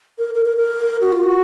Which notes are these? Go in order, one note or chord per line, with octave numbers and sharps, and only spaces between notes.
A#4
A#4
A#4
A#4
F#4
F4
F#4